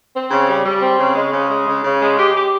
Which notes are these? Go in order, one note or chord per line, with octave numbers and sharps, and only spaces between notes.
C4
C#3
G3
G3
C4
C#3
G#3
C#3
G#3
C#3
C#3
G#3
G4
G4